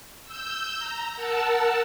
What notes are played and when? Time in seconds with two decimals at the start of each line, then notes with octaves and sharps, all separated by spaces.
0.24 E6 G6
0.78 A#5
1.16 A#4 F#5 A5 E6